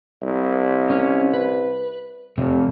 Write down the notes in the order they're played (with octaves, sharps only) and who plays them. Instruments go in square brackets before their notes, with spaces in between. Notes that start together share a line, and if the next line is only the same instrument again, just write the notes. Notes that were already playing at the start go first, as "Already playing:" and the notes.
[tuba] C2
[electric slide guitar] C#4
B4
[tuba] F1 [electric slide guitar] F2 C3